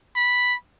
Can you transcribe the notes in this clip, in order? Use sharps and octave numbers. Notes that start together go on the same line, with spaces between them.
B5